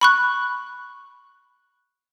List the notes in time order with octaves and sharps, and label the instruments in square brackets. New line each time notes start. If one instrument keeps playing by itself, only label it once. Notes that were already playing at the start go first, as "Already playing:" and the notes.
[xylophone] B5 C#6 F#6